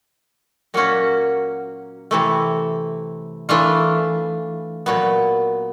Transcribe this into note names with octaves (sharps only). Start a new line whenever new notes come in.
A#2 F#3 A#3 C#4 F#4
C3 E3 A3
E3 A3 D4 F4
A#2 F#3 B3